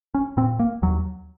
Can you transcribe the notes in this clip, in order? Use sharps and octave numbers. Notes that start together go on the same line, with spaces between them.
C#4
A#2 C4
A#3
D#2 F#3